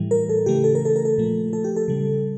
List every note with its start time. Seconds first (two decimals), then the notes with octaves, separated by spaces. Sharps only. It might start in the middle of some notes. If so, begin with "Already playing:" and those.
Already playing: A2 E3 G3
0.11 A#4
0.29 A4
0.46 C#3 E3 A3 G4
0.64 A4
0.75 A#4
0.85 A4
0.96 A#4
1.05 A4
1.18 A#2 F3 A3
1.53 A4
1.64 G4
1.76 A4
1.88 C#3 G3